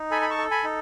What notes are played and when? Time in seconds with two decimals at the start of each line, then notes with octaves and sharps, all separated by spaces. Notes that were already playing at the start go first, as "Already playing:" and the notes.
Already playing: D#4
0.11 A4 G#5 B5
0.22 B5
0.30 A5 C#6
0.38 A4
0.51 G#5 B5
0.64 D#4